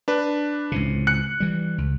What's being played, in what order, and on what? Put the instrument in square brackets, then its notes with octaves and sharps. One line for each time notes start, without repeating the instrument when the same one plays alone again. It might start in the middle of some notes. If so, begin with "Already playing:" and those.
[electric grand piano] D4 B4
[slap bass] C#2 A2 C3
[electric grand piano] F#6 C#7
[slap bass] E3 G3
C#2